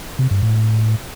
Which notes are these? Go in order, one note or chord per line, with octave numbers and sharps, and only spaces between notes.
C3
G2
A2